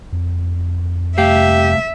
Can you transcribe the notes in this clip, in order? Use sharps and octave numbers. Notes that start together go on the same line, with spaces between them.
F2
C2 A3 G4 E5 F5